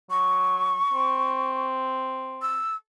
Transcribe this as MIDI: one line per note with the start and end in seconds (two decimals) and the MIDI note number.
0.10 0.77 54
0.10 1.66 85
0.93 2.60 60
2.42 2.74 88